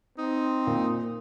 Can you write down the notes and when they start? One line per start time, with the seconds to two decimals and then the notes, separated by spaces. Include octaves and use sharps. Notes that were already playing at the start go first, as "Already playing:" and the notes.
0.18 C4 D#4
0.67 A#2